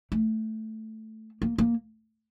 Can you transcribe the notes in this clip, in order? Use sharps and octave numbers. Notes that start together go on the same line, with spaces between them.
A3
A#3
A#3